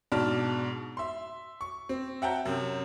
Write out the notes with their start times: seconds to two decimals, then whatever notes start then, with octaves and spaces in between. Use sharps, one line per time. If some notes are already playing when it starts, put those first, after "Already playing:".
0.12 G#2 B2 D4 A5 F6
0.97 E5 C6
1.61 C#6
1.89 C4
2.22 E5 F#5 G5 A5 A#5 G6
2.45 F#2 C3